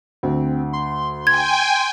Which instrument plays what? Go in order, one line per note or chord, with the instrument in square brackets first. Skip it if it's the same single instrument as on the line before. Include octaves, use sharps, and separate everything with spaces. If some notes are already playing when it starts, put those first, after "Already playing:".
[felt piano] D2 [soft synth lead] C4
[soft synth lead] C6
[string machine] G5 G#5 [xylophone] G#6